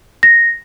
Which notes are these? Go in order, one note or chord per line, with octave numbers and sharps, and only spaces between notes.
A#6